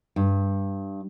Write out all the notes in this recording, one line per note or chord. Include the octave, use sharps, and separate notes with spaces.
G2